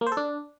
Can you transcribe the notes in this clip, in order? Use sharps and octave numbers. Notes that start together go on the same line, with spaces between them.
A#3
C5
A4
D4